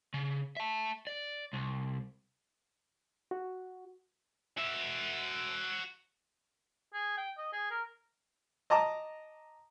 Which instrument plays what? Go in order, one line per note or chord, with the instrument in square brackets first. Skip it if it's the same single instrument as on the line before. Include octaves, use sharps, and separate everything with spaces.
[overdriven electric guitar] C#3
E5 A5
D5
C2
[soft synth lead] F#4
[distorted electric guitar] F#4 E5
[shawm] G#4
G5
D#5
G#4
A#4
[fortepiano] D#5 A5 A#5 D6